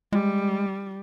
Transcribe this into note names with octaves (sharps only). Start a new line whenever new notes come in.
G3 G#3